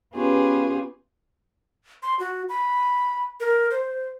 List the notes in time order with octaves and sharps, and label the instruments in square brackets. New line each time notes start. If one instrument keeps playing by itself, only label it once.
[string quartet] B3 C#4 F4 G4 G#4 B4
[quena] C6
F#4
B5
A#4
C5